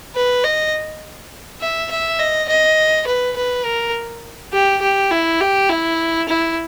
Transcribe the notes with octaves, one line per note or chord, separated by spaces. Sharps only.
B4
D#5
E5
E5
D#5
D#5
B4
B4
A#4
G4
G4
E4
G4
E4
E4